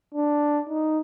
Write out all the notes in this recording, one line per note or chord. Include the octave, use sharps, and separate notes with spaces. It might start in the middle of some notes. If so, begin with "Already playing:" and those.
D4
D#4